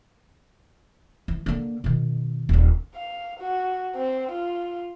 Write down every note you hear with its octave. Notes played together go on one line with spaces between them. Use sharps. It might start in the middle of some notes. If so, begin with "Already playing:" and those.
E3
D3 A#3
B2 D#3
D#1 D4
F5
F#4
C4
F4